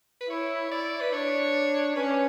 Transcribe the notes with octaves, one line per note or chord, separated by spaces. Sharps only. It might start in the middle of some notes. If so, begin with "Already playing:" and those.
B4
E4 C#5
E4 D5
B4
D4 C#5
C#4 B4
C#5
B4